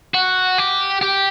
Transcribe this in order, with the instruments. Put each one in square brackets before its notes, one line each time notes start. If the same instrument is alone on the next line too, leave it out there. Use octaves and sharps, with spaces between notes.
[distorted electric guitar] F#4
G4
G4